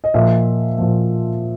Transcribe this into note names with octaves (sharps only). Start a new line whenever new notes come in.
D#5
A#2 F3 E5
A#2 F3